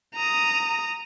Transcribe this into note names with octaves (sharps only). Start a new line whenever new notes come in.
A#5 D#6